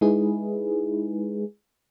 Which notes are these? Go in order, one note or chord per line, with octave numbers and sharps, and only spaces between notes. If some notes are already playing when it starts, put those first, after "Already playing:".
G#3 D#4 E4 G#4 B4